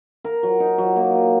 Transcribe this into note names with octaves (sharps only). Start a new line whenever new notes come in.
A#4
F#3
D#4
F#3
A#3
F#3